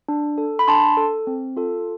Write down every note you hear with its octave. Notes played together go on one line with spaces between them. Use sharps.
D4
A4
B5
D4 A5 C6
A4
C4
F4 A4